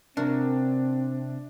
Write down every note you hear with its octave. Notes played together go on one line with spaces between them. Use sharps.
C3 C4 D4 F#4 A#4